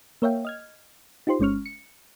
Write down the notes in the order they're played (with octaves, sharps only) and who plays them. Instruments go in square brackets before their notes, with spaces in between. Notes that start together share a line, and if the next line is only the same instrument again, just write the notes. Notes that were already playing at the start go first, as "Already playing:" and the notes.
[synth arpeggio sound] A#3 A#4 C#5 E5 F5 G5
D#5 F6 G#6
D#4 F4 G4 C5 C6
G1 G#3 C#4 C#6 F6
C#7